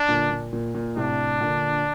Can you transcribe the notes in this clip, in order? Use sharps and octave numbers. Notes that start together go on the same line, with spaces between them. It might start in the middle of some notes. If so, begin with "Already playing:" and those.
Already playing: D4
A#2 D3
A#2
A#2
A#2
A2 C3 D4
A#2 D3